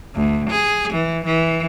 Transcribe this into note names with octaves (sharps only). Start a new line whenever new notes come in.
D2
G#4
E3
E3